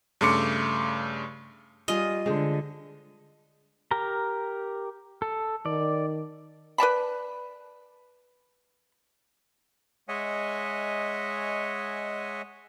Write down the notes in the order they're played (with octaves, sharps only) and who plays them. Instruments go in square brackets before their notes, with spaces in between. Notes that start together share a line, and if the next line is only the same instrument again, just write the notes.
[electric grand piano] G2 C#3 A3 C6 D6 C#7
[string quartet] G3 [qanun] F4 G#4 [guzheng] D#5
[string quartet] D3 [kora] G#3 C5
[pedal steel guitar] G4 A#4 A#5
A4
[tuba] D#3 [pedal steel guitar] D5
[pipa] B4 D5 A5 B5
[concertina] G#3 C#5 D#5 E5 F#5 G#5